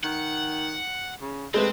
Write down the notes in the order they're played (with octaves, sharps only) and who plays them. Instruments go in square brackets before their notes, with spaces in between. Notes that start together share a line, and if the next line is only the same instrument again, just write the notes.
[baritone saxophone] D#3 [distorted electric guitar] F#5
[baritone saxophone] C#3
[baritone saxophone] C3 [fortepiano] G#3 A3 B4 [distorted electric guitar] C4